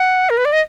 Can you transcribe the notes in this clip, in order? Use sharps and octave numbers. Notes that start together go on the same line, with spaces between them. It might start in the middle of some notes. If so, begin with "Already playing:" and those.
Already playing: F#5
A#4
B4
D5
D#5